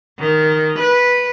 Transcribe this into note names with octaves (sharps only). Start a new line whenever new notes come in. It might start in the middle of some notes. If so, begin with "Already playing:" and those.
D#3
B4